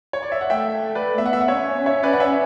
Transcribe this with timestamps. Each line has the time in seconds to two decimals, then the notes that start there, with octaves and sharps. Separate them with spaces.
0.13 C#5
0.23 D5
0.32 E5
0.41 F#5
0.50 A3 E5 G5
0.95 B4 D5
1.18 B3 E5
1.26 F#5
1.33 E5
1.41 F#5
1.48 C#4 C#5 E5
1.86 C#5 E5
2.03 B4 D5
2.13 F#5
2.20 C#5 E5